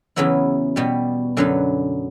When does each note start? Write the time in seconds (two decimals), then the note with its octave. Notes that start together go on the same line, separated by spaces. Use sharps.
0.16 E2 C#3 F#3 B3 E4
0.76 B2 G3 B3
1.37 F#2 D3 F#3 B3